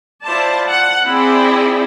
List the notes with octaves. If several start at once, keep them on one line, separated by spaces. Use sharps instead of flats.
E4 F4 C5 D5 A5
F#5
C4 E4 G#4 D5 G5